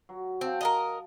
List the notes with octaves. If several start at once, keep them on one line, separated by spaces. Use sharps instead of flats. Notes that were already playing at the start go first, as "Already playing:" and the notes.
F#3
C4 F5 A5
A#4 B4 D#5